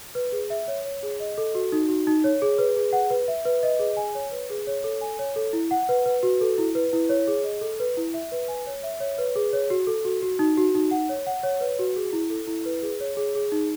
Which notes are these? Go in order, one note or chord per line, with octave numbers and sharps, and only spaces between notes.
B4
G#4
E5
C#5
C#5
G#4
D#5
A4
F#4
D#4
F#4
D#4
C#5
G#4
B4
G#4
F#5
B4
E5
B4
D#5
G#4
G#5
C#5
B4
G#4
C#5
A4
G#5
C#5
A4
E4
F#5
B4
B4
F#4
A4
E4
B4
E4
C#5
G#4
D#5
A4
B4
E4
E5
B4
G#5
C#5
E5
C#5
B4
G#4
C#5
F#4
A4
F#4
F#4
D#4
F#4
D#4
F#5
C#5
F#5
C#5
B4
F#4
G#4
E4
A4
E4
B4
G#4
C#5
G#4
G#4
D#4